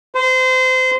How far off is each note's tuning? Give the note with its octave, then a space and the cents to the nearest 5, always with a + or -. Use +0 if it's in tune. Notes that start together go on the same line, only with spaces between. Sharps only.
C5 -25